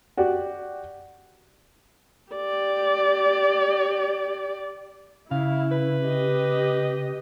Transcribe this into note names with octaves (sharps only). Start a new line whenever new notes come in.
F#4 G4 D5
G4 D5
C#3 E4 F5
B4
G4 D#5